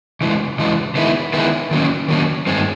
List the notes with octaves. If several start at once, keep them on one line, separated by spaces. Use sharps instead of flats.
C#3 E3 G#3
C#3 E3 G#3
D#3 G#3 B3 E4
D#3 G#3 B3 E4
D#3 F#3 A#3 C#4
D#3 F#3 A#3 C#4
G2 D#3 G#3 C4